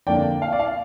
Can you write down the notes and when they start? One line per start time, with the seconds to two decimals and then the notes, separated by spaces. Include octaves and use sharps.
0.07 F2 D3 A#3 D4 D5 G5
0.42 F5
0.53 D5
0.60 F5